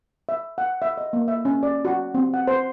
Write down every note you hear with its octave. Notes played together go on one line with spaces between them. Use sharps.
E5
F#5
E5
D#5
A#3
E5
C#4
D5
F#4
C4
F#5
C5